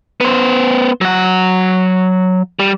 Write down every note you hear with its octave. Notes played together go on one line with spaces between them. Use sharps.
B3 C5
F#3 F#5
G3